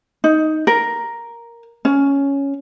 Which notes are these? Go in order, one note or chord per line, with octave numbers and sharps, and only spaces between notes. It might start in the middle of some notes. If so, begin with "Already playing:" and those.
D#4
A#4
C#4